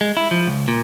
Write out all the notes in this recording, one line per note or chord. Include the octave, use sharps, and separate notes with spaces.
G#3
E4
F3
C#2
A#2